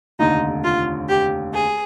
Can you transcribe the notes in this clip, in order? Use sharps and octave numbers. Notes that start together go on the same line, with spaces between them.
F1 D#2 D3 D#4
F4
G4
G#4